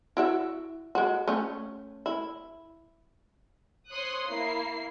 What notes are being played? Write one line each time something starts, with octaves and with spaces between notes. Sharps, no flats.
E4 F#4 E5
G#3 F#4
A3 C#4
E4
C5 C#5 C6 D#6 F#6
A#3 E4 C7